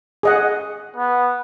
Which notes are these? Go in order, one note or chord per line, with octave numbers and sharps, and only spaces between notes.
G#4 D#5 F#5
B3